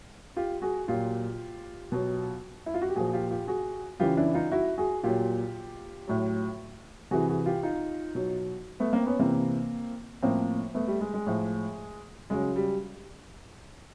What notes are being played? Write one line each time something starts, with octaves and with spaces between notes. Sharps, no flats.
F4 G4
F#4 G#4
A#2 F#3 F4 G4
B2 F#3
E4
F4
F#4
G4
A#2 F3 F#4 G#4
F4 G4
F4 G4
F#4 G#4
C#3 E3 F4 G4
D4 E4
D#4 F4
E4 F#4
F#4 G#4
A#2 F#3 F4 G4
A2 F#3
C3 E3 F#4 G#4
F#4 G#4
F4 G4
D#4 F4
B2 F#3
A3 B3
A#3 C4
B3 C#4
C3 E3 A#3 C4
A2 F3 A#3 C4
A3 B3
G3 A3
G#3
G#3
A2 F3
C#3 F#3 G#3
G3